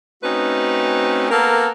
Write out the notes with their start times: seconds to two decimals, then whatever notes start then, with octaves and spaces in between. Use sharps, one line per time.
0.23 A3 C4 C#4 D#4 F#4 B4
1.30 A#3 B3 A4 A#4